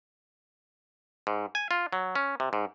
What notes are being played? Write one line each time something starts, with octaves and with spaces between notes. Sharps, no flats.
G#2
G#5
F4
F#3
C#4
C3
G#2